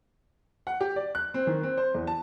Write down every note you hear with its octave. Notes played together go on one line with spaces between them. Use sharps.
F#5
G4
D5
F#6
C4
D#3
C4
C5
E2
A5